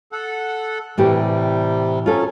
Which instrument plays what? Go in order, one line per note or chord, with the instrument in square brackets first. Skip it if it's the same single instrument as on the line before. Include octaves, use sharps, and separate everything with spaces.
[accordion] A4 F#5
[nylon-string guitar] A2 E3 G4 [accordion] C3 G3
[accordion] F#3 C#4 [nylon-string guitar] F4 A4